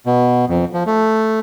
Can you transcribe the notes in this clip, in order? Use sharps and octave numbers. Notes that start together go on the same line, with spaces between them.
B2
F2
F3
A3